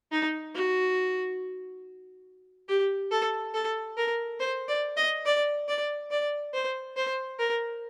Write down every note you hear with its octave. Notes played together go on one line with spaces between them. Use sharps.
D#4
F#4
G4
A4
A4
A#4
C5
D5
D#5
D5
D5
D5
C5
C5
A#4